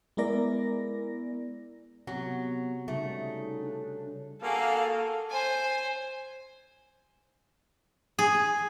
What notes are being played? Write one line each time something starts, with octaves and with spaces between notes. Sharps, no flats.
G#3 B3 E4 A#4 D5 A#6
C3 F#3 B3 F#4
C#3 G3 A3 D#4
D4
A#3 F#4 G#4 A4 F5 F6
C5 G#5
G#4